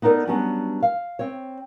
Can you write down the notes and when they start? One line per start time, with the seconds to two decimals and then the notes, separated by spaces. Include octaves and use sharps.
0.02 B3 D#4 A4 A#4 D5
0.27 F#3 G3 B3 C#4 D4
0.82 F5
1.19 C4 C#5